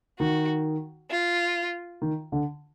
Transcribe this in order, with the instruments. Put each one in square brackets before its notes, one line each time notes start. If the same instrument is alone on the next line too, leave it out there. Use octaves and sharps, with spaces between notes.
[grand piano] D#3 [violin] F#4
[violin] F4
[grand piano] D#3
D3